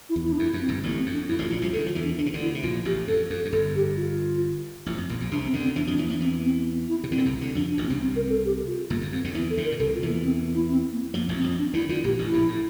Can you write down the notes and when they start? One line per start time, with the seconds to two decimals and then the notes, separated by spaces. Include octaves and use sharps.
0.09 E4
0.16 E2
0.24 E4
0.32 D4
0.38 F2 E4
0.53 F2
0.61 C4
0.68 G1 G2
0.83 A1 A2 A#3
0.98 C4
1.06 F2
1.13 D4
1.28 F2 E4
1.39 A1 A2
1.44 F4
1.50 A#1 A#2
1.58 F4
1.61 C2 C3
1.73 D2 D3 A4
1.86 F3 F4
1.95 E2 E3
2.03 D4
2.18 D3 D4
2.26 C3
2.34 D2 D3
2.41 E4
2.55 C3
2.62 A#1 A#2 F4
2.85 A1 A2 G4
3.08 F2 A4
3.30 F2 A4
3.45 F2
3.52 G1 G2 A4
3.75 G4
3.97 F4
4.86 A1 A2
4.98 F2
5.09 A#1 A#2
5.20 A#1 A#2
5.31 C2 C3 D4
5.47 C4
5.53 D2 D3
5.62 C4
5.76 E2 E3 D4
5.87 F2 F3
5.92 D4
5.98 E2 E3
6.07 A#3
6.10 E2 E3
6.21 E2 E3 C4
6.44 C4
6.88 E4
7.04 C3
7.10 D2 D3 C4
7.18 A#2
7.25 C2 C3
7.41 D2 D3
7.55 F2 F3 D4
7.70 D4
7.78 A1 A2
7.86 C4
7.90 C2 C3
8.01 C4
8.16 A#4
8.30 A4
8.45 G4
8.67 F4
8.90 G1 G2 A#3
9.01 F2
9.12 F2 C4
9.24 D2 D3
9.34 E2 E3 E4
9.50 A4
9.57 D2 D3
9.65 A#4
9.72 A#2
9.80 C2 C3 A4
9.95 F4
10.03 E2 E3
10.09 A#3
10.24 C4
10.54 E4
10.70 C4
10.92 A#3
11.14 F2 F3 A#3
11.29 A1 A2
11.37 C4
11.44 F2
11.59 D4
11.74 D2 D3 E4
11.89 D2 D3 F4
12.04 A#1 A#2 G4
12.19 A1 A2
12.27 E4
12.33 A#1 A#2
12.48 A2